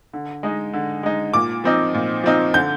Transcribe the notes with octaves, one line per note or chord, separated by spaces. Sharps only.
D3
G#3 D#4
D3
G#3 D#4
A#2 D6
F3 C4 D#4
A#2
F3 C4 D#4
D3 G6